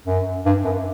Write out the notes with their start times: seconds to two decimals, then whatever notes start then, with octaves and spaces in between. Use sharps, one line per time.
0.07 F#2
0.46 G2
0.64 F#2